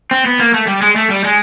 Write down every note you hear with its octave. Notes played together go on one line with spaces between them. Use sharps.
C4
B3
A#3
A3
G3
G#3
A3
G3
G#3